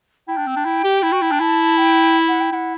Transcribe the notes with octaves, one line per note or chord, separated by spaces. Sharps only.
E4 G5
D4
C4
D4
E4
G4
E4
F#4
E4
D4
E4 A5
G5
F#5
G5
E4 F#5